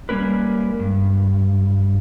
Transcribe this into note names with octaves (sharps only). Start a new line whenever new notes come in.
G3 G#3 A#3 C#4 A#4 B4
G2